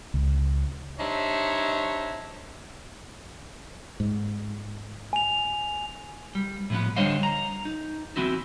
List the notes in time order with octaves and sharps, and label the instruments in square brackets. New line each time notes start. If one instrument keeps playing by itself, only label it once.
[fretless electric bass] C#2
[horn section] G3 D4 D#4 C5 C#5 E5
[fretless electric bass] G#2
[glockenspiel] G#5 F7
[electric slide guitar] G3
A2 F3 B3
D3 G3 C5 C#5 D#5 F5
A#5
D#4
E3 B3 C4 E4 F#4